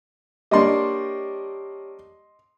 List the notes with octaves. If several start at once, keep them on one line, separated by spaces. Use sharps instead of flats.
G3 A#3 D4 G4 C#5 D#5 C6 C#6